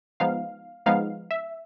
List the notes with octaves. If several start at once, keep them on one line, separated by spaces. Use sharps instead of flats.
F3 G#3 B3 D#4 F5
F3 G#3 B3 D#4 F5
E5